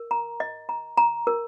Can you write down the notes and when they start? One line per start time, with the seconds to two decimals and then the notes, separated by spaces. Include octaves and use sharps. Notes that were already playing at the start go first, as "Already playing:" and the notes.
Already playing: A#4
0.11 A#5
0.40 D#5
0.69 A#5
0.97 A#5
1.27 A#4